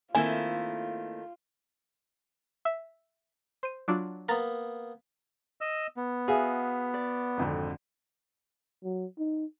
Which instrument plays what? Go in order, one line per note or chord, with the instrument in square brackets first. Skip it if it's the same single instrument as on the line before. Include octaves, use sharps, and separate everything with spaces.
[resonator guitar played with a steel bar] D#3 A3 E4 [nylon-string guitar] A#3 C4 [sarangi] F4 [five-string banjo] G#5
[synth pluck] E5
C5 D#7
F#3 D4 F4
[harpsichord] A#3 B3 [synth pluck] A#5 A6
[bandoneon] D#5 E6
B3
[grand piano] F#4 E5 F5 [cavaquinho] G#4
[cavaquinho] D5
[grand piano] G#1 F2 D3
[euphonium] F#3
D#4